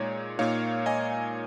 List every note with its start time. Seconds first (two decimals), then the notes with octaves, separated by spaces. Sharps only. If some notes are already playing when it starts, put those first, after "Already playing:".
Already playing: A#2 G#3 D#4 C#5
0.39 A#2 A#3 D#4 C#5 F5
0.86 D#5 G#5